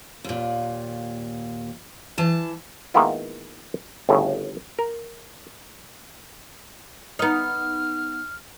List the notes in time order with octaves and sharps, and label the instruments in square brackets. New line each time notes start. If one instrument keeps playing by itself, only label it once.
[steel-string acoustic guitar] D#2 A#2
E3 A5
[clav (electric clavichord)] D#3 G#3 A#3 B3 E4 F4
G1 A2 C#3
A#4
[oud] B3 D#4 [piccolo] F6